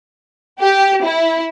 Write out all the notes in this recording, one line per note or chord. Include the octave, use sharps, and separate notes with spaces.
G4
E4